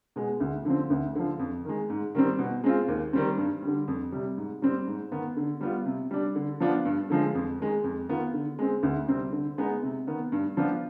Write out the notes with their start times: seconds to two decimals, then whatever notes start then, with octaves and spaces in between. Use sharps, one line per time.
0.16 B2 G#3
0.40 D2
0.65 D3 F3 C4
0.90 D2
1.15 D3 F3
1.39 F2
1.65 D#3 G#3
1.90 G#2
2.15 D#3 G3 C4
2.39 B2
2.64 G#3 C4 F4
2.88 D#2
3.13 D#3 G3 C4
3.38 G2
3.62 D3 G3
3.88 F2
4.12 C3 G3
4.37 G#2
4.62 G3 C4
4.87 G#2
5.12 D#3 B3
5.37 D3
5.61 G3 B3 F4
5.86 C3
6.11 G3 D4
6.35 D3
6.60 F3 B3 D4 F4
6.85 G2
7.10 D3 F3 G#3
7.35 F2
7.59 D#3 G#3
7.84 F2
8.09 D#3 B3 F4
8.33 D3
8.59 G#3 C4
8.83 D2
9.08 C3 G3 C4
9.33 D3
9.58 G#3 B3 D#4
9.83 C3
10.07 D#3 B3
10.32 G2
10.57 F3 B3 D4 F4